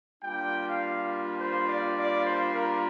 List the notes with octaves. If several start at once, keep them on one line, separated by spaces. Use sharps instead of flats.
G3 A#3 D4 F4 G5
F5
C5
D5
D5
C5
A#4